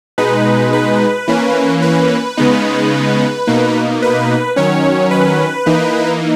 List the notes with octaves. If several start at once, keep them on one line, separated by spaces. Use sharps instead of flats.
B2 G#3 D#4 B4
B4
E3 A#3 C#4
B4
C#3 G#3 B3 D#4
B2 A#3 D#4
B4
D#3 F#3 C#4 C#5
B4
E3 A#3 D#4